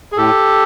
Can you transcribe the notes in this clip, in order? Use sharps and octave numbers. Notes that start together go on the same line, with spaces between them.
G#4
A2 G4 A4